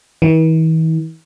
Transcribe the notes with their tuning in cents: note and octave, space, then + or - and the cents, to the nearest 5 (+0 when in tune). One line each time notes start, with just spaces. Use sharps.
E3 -45